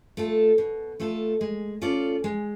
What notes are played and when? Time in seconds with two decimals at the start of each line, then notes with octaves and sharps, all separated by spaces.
0.17 A3 F4 A4
0.58 B2
1.00 A3 F4 A4
1.41 G#3
1.82 C#4 F4 A4 D5
2.24 G#3